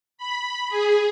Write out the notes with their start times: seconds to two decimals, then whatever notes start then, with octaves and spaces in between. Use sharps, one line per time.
0.18 B5
0.70 G#4